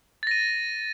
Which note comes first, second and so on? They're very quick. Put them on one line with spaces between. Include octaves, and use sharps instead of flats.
A6 A#6 D#7